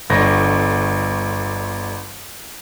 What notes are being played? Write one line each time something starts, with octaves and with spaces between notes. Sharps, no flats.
G1 D3 C#6 A#6